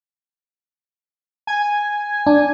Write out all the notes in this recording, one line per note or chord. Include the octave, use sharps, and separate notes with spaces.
G#5
D4